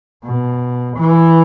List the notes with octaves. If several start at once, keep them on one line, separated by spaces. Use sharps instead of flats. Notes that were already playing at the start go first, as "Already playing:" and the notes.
B2
E3